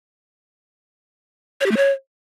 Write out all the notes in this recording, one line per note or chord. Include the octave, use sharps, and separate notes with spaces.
C#5
G4
A3
C#5